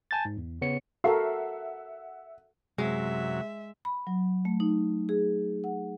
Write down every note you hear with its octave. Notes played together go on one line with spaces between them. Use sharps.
G#5 A5 G6 A6
G#2
E2
C#3 B3 C#5 C#7
F#4 A4 A#4 E5 F#5 C7
F#2 C3 F#3 G#3 E5
B5
F#3
A3
D#4
G#4
F#5